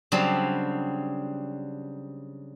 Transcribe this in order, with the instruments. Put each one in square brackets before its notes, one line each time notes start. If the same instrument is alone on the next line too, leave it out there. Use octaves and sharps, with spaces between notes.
[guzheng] C#3 F#3 G3 C4 D4